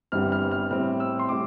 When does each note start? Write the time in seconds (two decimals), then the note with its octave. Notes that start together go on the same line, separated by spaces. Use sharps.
0.12 G1 G2 E3 G3 C4 F6
0.32 F6
0.51 F6
0.70 A2 G3 C4 E4 F6
1.00 E6
1.19 C6
1.29 A2 G3 D6